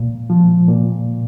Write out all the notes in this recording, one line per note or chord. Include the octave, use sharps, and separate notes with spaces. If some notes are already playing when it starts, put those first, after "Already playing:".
Already playing: A#2
F3
A#2